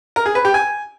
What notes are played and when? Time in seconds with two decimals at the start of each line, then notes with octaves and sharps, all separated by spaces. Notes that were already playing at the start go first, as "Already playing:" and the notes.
0.16 A#4
0.26 G#4
0.35 B4
0.45 G4
0.54 G#5